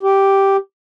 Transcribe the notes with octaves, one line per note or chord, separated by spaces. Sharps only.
G4